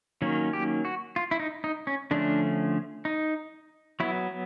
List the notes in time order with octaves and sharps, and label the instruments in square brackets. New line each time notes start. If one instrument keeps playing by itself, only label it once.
[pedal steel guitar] D#3 F#3 A#3 C#4
G4
F#4
F4
E4
D#4
D#4
C#4
D3 F3 A3 C#4 D4
D#4
F#3 B3 E4